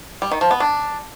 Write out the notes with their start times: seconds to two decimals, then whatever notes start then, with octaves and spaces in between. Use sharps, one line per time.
0.22 G3
0.31 D#3
0.41 F3
0.51 B3
0.60 D4